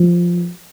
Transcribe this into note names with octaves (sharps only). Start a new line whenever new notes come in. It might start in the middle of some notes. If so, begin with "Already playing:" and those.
Already playing: F3